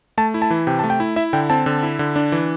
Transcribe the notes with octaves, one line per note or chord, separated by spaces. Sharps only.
A3 A5
E4
A5
E3
C3 G5
A3 A5
G5
E4
E4 E5
D3 G5
C4 A5
D3
E4
D3
D4
E3